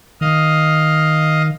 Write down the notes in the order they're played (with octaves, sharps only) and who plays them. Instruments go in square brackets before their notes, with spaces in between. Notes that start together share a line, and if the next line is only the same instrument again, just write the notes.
[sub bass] D#3 [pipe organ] D#5 F5